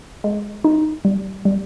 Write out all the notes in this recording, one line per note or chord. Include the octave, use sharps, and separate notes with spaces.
G#3
D#4
G3
G3